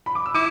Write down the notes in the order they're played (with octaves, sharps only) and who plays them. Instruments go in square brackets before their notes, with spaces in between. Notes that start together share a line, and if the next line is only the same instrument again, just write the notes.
[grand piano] B5
D6
E6
[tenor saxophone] E4 [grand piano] D6